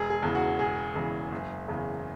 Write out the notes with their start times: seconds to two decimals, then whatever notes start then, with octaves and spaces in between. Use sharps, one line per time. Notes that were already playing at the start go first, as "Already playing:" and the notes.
Already playing: E1 G#4
0.10 G#4
0.22 E2 C#3 E3
0.35 F#4
0.59 E1 G#4
0.95 E2 C#3 E3
1.32 F#1
1.68 E2 C#3